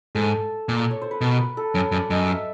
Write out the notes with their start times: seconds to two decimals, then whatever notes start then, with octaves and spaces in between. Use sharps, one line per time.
0.15 G#2 A4
0.69 A#2
0.80 D5
0.91 C#5
1.02 C5
1.11 B4
1.21 B2 A#4
1.39 B4
1.57 A4
1.74 F#2 C#5
1.92 F#2 D5
2.10 F#2 D#5
2.28 E5